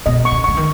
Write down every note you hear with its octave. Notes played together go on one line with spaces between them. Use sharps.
B2 D#5
C#6
C#3
C#3 C#6
D#3